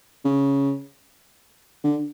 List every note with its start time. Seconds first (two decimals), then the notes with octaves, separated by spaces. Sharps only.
0.25 C#3
1.84 D3